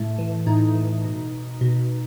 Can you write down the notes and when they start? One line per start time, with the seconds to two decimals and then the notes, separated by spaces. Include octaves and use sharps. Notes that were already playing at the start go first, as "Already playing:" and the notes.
Already playing: A2 A3
0.18 E3
0.47 A2 D#4
0.75 E3
1.05 B2
1.61 B2